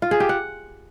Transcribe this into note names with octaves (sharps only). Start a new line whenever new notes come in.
F4
G#4
G4
F#5